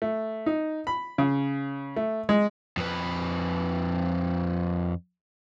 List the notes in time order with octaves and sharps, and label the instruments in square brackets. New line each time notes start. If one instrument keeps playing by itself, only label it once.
[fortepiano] A3
D#4
B5
C#3
A3
G#3
[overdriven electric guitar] F2 B4